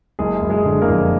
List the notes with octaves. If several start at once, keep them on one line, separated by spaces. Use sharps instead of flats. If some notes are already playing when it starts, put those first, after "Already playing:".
F#1 G#3 G#4
F#1
G#3 G#4
D3
A#3 A#4
F2